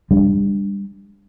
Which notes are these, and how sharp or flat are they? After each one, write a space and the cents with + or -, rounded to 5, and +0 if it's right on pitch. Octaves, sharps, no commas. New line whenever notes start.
G3 +25 D4 +0